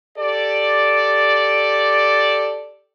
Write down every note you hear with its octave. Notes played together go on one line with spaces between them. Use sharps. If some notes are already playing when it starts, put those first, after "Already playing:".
G4 A4 D5